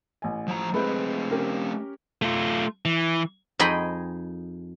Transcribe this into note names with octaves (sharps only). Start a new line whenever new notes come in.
A1 G#5
F3 A#5
G#3 A3 C4 B4 B5
C#4 G4 A#4
A3 F4
E3
F2 D#4 G#4 D#5 G5 B5